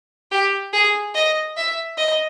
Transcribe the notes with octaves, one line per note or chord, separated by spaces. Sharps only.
G4
G#4
D#5
E5
D#5